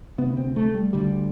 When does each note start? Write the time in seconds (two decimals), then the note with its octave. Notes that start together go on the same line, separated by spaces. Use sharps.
0.18 D2 C3 B3
0.37 C4
0.56 A3
0.75 G3
0.93 D2 D3 G3